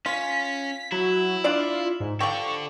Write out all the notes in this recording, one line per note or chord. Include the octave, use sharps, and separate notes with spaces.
C#4 F4 B6
F#3 E4
D4 F4 D5
G#2
F3 G4 A4 D5 C#6